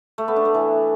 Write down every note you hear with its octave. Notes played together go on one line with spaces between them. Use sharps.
A3
B3
D4
A3
E3